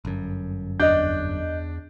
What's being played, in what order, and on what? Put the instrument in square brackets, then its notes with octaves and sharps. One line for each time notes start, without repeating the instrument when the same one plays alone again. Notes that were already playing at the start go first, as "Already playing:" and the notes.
[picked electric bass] G1 F#2
[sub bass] E2 [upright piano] D4 [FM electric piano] D#5 F#6 G6